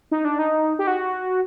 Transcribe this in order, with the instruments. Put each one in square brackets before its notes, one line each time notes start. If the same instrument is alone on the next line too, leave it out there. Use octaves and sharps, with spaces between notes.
[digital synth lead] D#4
D4
D#4
G4
F#4